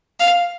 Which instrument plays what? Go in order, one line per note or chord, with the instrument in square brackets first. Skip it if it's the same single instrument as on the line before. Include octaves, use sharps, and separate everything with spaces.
[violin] F5